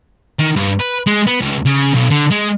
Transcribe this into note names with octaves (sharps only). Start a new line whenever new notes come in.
D#3
G2
B4
G#3
B3
C#2
C#3
B1
D3
G#3